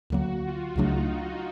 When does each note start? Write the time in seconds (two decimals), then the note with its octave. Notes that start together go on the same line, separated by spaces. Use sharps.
0.10 D2 D3 F#3 A#3 F#4
0.44 F4
0.76 C#2 C#3 F#3 A3 D4 D#4